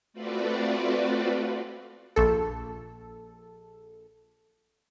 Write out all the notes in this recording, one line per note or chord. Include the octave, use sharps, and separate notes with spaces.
A3 C4 F4 F#4 B4 D5
A#1 A4